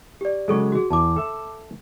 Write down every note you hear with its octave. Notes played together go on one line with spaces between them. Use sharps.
G4 D5
C#3 F#3 G#3 G#4 A4 C#6
F#4 G#4
E2 A5 D6
A4 E5